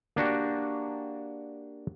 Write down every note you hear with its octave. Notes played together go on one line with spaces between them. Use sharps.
A#3 D4 F#4 G4